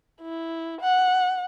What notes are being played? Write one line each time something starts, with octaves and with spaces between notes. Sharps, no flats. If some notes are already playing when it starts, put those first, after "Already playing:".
E4
F#5